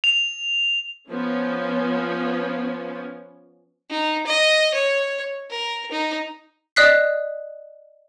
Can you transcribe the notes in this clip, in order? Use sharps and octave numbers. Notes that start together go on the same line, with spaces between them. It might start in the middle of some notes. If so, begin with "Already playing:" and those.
F7
F3 B3 C#4
D#4
D#5
C#5
A#4
D#4
D5 D#5 D#6 F#6 B6 C7